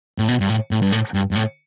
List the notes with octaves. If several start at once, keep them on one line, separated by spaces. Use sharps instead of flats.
A2
B2
G2
A2
A2
G2
A2
G2
G2
A2